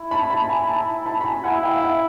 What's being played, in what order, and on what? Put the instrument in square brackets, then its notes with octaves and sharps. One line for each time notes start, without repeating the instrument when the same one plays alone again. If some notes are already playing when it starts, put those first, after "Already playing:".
Already playing: [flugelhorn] E4
[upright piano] A5 B5
A5 B5
B5
G#5 A#5
A5 B5
A5 B5
B5
G#5 A#5
[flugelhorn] E4 [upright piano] F#5 G#5
[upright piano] F5 G5
E5 F#5